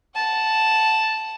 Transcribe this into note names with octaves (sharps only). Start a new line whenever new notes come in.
F#5 A5